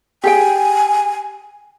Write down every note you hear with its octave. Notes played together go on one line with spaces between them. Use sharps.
G4 G#4 G5 G#5